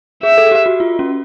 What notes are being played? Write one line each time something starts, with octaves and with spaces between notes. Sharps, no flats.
G#4 E5
A4
G4
F#4
F4
C#4